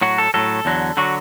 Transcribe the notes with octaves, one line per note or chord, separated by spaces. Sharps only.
A2 F#3 F#4
A4
A2 F#3 A4
E2 D3 F#3
D3 F#3 F#4